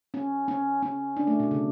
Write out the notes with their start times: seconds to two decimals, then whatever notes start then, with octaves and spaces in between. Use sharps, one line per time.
0.14 C#4
0.48 C#4
0.82 C#4
1.17 D4
1.27 A3
1.40 B2
1.51 C#3